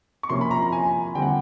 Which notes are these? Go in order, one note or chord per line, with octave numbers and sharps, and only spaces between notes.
C#6
C3 F3 A#3 C#4 C6
B5
A#5
A#5
G#5
D3 G3 C4 G5
F#5